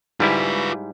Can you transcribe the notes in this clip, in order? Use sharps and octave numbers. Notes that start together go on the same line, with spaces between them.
G#2 G3 E4 F4 B4